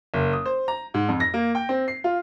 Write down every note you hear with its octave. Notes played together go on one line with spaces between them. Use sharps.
F#1
D#6
C5
A#5
G#2
F2
A#6
A#3
G5
C4
C7
F4